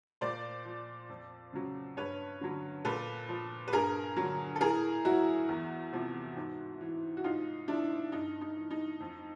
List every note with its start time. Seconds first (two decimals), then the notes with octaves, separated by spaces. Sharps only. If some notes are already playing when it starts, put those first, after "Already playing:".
0.21 A#2 C5 D5
0.65 F3
1.09 F2
1.53 C#3 F#3
1.97 G2 B4 C#5
2.41 D3 F#3
2.85 A#2 A4 B4
3.29 F3
3.68 B4
3.72 G2 G#4 A#4
4.16 D3 F#3
4.56 A4
4.61 A2 G#4 A#4
5.05 F#3 E4 F#4
5.49 E2
5.93 C3 F3
6.37 G#2
6.81 E3
7.17 F#4
7.24 G#2 D#4 F4
7.68 F3 D4 E4
8.12 G2 D#4
8.41 D#4
8.56 E3
8.71 D#4
9.00 F2